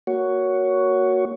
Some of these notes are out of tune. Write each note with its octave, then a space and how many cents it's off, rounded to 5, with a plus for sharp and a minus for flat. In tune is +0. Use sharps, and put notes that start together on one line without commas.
A#3 +0 F#4 +0 C#5 +10